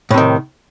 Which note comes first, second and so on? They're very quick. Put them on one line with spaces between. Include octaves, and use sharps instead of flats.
A2 C3 D#3